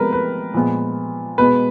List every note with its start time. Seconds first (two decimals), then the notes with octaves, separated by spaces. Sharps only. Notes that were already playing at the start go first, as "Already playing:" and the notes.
Already playing: C3 F3 G#3 B3 A#4 B4
0.13 B4
0.54 A#2 F3 G#3 B3
1.38 B2 G#3 B3 B4